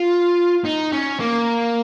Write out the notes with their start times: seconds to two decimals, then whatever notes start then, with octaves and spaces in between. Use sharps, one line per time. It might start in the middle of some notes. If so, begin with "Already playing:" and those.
Already playing: F4
0.65 D#4
0.92 C#4
1.20 A#3